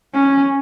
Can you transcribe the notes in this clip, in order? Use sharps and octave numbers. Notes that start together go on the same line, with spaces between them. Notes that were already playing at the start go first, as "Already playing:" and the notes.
C#4